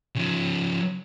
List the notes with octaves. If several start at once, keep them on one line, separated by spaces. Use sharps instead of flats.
C#3 F3